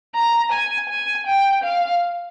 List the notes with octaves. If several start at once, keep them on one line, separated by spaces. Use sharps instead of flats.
A#5
G#5
G#5
G5
F5